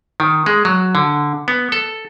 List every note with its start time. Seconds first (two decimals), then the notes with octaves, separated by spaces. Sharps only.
0.20 D#3
0.46 G#3
0.65 F#3
0.95 D3
1.48 B3
1.72 A4